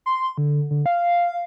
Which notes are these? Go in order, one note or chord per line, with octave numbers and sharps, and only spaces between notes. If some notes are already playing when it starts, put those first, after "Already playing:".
C6
D3
D3
F5